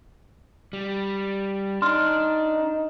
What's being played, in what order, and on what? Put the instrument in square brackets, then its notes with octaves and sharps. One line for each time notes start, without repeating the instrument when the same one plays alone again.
[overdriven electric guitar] G3
[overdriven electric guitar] D4 [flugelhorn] D#4 [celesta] C6 F6